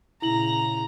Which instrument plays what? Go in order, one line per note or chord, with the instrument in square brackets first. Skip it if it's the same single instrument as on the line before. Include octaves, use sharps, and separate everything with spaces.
[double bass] A#2 C#3 [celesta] E4 F#7 [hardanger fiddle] A#5